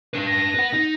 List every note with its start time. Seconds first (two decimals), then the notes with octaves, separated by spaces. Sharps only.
0.14 D4 B4
0.26 A#6
0.55 B4 F#5
0.73 D#4